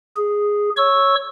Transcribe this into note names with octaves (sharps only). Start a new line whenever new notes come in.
G#4
C#5 C#6 E6